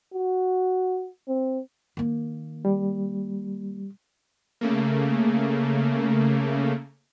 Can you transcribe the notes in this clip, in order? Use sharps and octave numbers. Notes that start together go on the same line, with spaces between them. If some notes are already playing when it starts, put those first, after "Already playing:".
F#4
C4
D#3 A#3
G3
C#3 A3 A#3